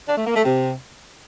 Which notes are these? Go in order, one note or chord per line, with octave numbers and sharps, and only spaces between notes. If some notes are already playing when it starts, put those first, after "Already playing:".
D4
A3
A#3
A3
C3